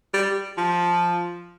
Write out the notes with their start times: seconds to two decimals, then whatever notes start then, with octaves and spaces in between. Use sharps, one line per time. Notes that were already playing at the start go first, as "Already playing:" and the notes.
0.14 G3
0.58 F3